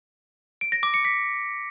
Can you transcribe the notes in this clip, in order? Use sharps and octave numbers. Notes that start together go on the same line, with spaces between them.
D7
A#6
D6
C#7
B6